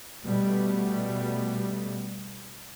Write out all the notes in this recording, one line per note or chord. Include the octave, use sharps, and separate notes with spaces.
B2 G3 A3 B3